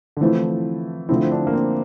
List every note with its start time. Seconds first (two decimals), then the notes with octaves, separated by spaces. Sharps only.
0.17 D3
0.21 E3 F3 A3 C4 E4
1.09 D3 F3 A3 C4 E4
1.25 C4
1.32 D4
1.47 A#3
1.53 C4